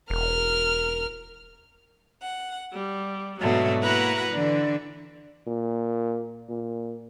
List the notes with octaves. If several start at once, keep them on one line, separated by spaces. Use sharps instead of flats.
E1 A#4 F6
F#5
G3
G#2 B2 D3 F#3 A3
A#3 E4 F#4 B4 F#5 A#5
D3 E3 D4
A#2
A#2